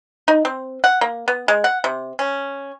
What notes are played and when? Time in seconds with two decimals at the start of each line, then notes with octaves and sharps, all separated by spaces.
0.28 D#4
0.45 C4
0.84 F#5
1.01 A#3
1.28 B3
1.48 G#3
1.64 F#5
1.84 C3
2.19 C#4